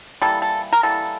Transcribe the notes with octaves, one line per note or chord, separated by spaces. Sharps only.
E3 G3 A#3 A4
A4
A#4
E3 G3 A#3 A4